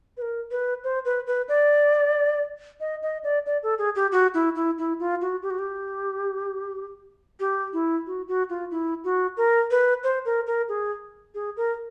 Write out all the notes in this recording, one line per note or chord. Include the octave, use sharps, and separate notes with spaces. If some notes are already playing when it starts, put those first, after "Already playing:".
B4
A#4
B4
C5
B4
B4
D5
D#5
D#5
D5
D5
A4
G#4
G4
F#4
E4
E4
E4
F4
F#4
G4
F#4
G4
G4
E4
F#4
F#4
F4
E4
F#4
A#4
B4
C5
A#4
A#4
G#4
G#4
A#4